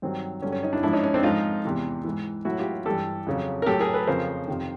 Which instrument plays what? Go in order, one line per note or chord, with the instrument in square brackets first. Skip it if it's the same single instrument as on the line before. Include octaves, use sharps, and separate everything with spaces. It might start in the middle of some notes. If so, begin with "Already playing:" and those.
[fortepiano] G2 D#3 F#3 C4
G2 D3 F#3 C#4
C#4
C#4 D#4
D4 E4
G#2 F3 D4 E4
C#4 D#4
C#4
C4 D4
G#2 F3 D#4 F4
E2 C3 E3
G#2 E3
A2 F#3 E4 F#4
F4 G4
G2 E3 G4 A4
F2 C#3 F#3
A#4
A2 F#3 G4 A4
G#4 A#4
A4 B4
F2 C#3 F3 A#4 C5
F2 C3 D#3